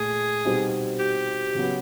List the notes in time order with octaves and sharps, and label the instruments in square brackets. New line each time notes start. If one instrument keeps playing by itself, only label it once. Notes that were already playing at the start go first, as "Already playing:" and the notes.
Already playing: [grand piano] A#2 A3 [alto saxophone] G#4
[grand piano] B2 G3 C4 D#4
[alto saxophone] G4
[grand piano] C#3 F#3 B3